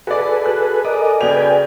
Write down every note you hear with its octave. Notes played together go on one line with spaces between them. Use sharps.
F#4 G#4 A4 B4 D5
F#4 F#6
A4 A#4 D5 D#5 G#5
C#3 F#4 B4 D5 G5 G#5 F7